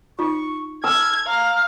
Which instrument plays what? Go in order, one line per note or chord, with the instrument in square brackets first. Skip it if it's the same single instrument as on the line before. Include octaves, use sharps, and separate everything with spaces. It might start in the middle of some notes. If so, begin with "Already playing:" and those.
[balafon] D#4 F4 [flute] C#6
[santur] E6 [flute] F6 [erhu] G#6
[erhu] F5 [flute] A#5